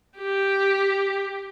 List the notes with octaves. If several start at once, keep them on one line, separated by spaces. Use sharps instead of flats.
G4